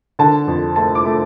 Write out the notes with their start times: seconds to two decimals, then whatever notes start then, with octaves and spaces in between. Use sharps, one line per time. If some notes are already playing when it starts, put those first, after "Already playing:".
0.19 D3 A5
0.48 F2
0.76 A3 A5
0.95 D6
1.05 A3